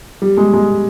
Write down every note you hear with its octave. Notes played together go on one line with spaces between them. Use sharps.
G3
G#3
G#3